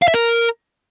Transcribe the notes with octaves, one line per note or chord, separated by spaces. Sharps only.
F5
E5
A#4